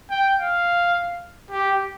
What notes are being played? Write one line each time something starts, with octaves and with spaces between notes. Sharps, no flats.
G5
F5
G4